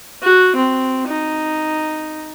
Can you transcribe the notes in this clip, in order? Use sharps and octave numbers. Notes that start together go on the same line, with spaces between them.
F#4
C4
D#4